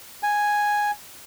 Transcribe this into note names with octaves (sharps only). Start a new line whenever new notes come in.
G#5